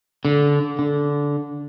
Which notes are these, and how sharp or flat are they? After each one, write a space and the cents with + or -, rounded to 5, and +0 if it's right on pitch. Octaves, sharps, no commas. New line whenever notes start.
D3 -20
D3 -15